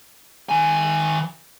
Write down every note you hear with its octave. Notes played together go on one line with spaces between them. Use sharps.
D#3 G#5